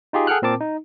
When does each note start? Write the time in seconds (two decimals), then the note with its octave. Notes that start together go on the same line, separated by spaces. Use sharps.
0.13 D#4 F4 G4 G#4
0.27 G#4 A4 F#5 G5 F6 F#6
0.42 A#2 C4 A#4 A5 D6
0.60 D#4